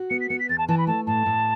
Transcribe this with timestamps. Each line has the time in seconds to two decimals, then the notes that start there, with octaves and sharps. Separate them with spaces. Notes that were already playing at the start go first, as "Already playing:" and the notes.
Already playing: F#4
0.10 B3 C#7
0.21 B6
0.29 B3 C#7
0.40 B6
0.49 E2 A6
0.58 A5
0.69 E3 A5
0.78 B5
0.87 A3 A5
1.07 A2 A5
1.26 A2